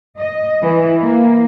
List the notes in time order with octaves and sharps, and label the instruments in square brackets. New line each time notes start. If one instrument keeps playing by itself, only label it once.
[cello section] D#5
E3
A#3